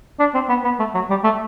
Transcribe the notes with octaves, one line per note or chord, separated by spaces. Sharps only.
D4
C4
B3
B3
A3
F#3
G3
A3